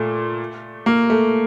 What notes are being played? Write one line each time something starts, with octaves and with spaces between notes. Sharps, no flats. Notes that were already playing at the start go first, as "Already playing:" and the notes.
Already playing: A#2 A3
A#3
A3